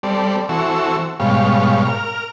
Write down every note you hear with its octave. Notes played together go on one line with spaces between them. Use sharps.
G3 C4 A4 D5
E3 C4 F#4 A4 C#6 E6
G#2 B2 G3 C#5 F5
A#4 F6